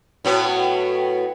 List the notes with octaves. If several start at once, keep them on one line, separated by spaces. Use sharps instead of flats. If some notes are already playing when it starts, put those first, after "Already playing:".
A2 F#3 B3